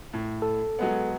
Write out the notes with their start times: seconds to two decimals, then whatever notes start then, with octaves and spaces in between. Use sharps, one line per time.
0.14 A2
0.42 A4
0.79 F#3 G#3 B3